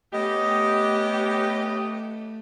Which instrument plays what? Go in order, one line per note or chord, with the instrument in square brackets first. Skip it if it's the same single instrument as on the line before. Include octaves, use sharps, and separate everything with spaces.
[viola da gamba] A3 [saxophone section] B3 C#4 G4 [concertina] D#5